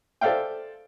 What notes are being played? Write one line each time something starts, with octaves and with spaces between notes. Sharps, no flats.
A4 C5 D5 E5 F5 G5